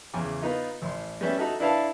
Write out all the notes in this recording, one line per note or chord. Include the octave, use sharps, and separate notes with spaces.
E2 C#3 G#5 D6
B3 D#4 F4
A1 C6
G3 B3 C#4 E5
D#4 F#4 A4 E5
D4 E4 B4 E5 F5 A5